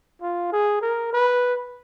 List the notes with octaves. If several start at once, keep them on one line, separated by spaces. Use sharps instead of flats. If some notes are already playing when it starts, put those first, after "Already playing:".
F4
G#4
A#4
B4